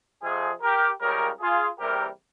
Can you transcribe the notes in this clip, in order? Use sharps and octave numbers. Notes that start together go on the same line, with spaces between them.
F2 C3 F3 F4 G#4
G4 A#4
C#2 C#3 G3 G4 A#4
F4 G#4
E2 C3 G3 A#3 G4 A#4